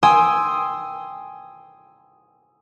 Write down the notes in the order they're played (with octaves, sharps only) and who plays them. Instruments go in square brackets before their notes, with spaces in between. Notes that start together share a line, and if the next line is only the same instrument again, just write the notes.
[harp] G5 G#5 C6 D#6 E6